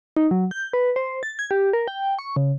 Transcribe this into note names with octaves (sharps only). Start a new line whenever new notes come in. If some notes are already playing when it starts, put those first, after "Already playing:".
D#4
F#3
G6
B4
C5
A6
G#6
G4
A#4
G5
C#6
C#3